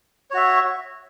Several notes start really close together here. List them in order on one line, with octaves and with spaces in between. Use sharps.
C#5 F#4 E5